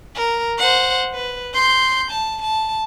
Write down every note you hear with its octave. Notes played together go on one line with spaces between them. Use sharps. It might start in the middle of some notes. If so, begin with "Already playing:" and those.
A#4
C5 F#5
B4
C6 G6
A5
A5